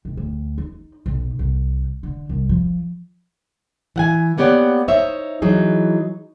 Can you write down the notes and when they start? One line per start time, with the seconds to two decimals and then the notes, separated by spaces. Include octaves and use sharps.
0.05 E1
0.17 D2
0.58 D#4
1.06 B1
1.39 C2
2.03 D3
2.29 C2
2.49 F3
3.96 E3 F#5 G#5
4.38 A#3 B3 G4 C#5 D5 F#5
4.88 D#4 C5 C#5 E5
5.42 E3 F#3 D#4 G#4